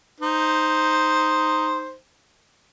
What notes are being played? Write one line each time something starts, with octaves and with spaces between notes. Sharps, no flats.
D#4 C5